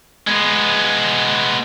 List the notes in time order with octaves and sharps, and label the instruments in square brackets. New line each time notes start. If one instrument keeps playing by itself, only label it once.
[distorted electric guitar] G#3 B3